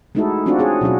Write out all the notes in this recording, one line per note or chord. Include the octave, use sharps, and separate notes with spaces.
G#3 A3 D#4 E4 F#4 A4
C4 D4 D#4 F4 F#4 D5
C4 G#4 C#5
B2 F#3 C#4 F#4